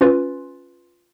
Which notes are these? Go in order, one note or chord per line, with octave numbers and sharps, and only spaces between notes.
C#4 F4 B4